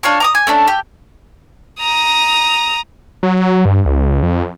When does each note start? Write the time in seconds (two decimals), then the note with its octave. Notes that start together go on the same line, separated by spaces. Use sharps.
0.03 D4 F4 C#5 C#6
0.20 A#5 D6 D#6
0.35 G#5
0.47 A3 C#4 D4
0.68 G4
1.80 A#5 D#6
3.23 F#3
3.65 G2
3.86 C#2
4.23 F2